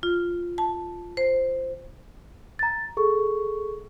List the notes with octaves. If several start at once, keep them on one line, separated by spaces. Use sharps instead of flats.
F4
A5
C5
A#5 A6
G#4 A4 C#6